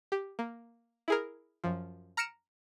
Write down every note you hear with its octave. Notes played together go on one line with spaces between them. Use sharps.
G4
A#3
E4 G#4 A#4
F#2 F3
A#5 F6 A#6 C#7 D7 E7